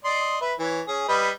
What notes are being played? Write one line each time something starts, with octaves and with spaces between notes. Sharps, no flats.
D5 D#5 C6
B4 E5
E3 C#5
C#4 G#4
G3 B4 D#5